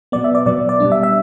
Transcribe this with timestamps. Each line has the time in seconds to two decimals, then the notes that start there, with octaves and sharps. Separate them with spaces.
0.12 B2 F#3 B3 D5
0.24 E5
0.35 D5
0.46 B2 F#3 B3 D5
0.69 D5
0.80 B2 G3 D4
0.92 E5
1.03 E5